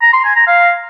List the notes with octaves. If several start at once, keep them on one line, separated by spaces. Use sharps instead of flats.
A#5
C6
G#5
A#5
F5